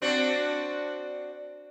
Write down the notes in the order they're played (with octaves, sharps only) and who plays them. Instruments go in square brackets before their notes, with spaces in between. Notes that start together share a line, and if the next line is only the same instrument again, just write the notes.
[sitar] C4 D4 F#4